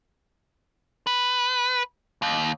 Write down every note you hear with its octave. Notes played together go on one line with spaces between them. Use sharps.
B4
D#2